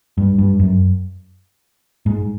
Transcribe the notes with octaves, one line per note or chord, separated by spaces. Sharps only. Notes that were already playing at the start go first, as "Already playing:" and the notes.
G2
G2
F#2
G#2